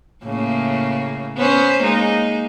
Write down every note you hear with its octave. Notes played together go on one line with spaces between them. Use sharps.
A2 C#3 A#3
B3 C#4 C5
G#3 A#3 D#4